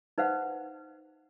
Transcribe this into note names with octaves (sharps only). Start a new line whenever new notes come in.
D#4 B4 C5 F5 F#5